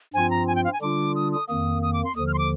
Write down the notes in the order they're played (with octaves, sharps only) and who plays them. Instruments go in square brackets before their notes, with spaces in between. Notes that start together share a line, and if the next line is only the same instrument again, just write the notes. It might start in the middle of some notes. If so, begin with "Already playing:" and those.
[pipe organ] G2 F3 C4 F4 [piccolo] G#5
[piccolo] A#5
G#5
G5
F5
G#5
[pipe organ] D3 G3 D4 F4 [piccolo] D6
[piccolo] D#6
D#6
[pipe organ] F2 D#3 A#3 [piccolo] D#6
[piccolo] D#6
D6
C6
[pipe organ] D#2 D3 F3 [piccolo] D#6
[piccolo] F6
C6
D6